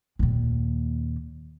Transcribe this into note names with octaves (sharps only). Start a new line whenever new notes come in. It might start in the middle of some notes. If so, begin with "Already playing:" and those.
D#2 A#2